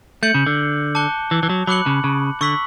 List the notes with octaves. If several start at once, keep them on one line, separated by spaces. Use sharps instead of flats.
A3 G6 C#7 F#7
C#3
D3
A5 D6 F#6 C#7 G7
E3
E3
F#3
F#3 B5 D6 F#6 C#7 F#7
C#3
C#3
D3 C#6 E6 B6 F#7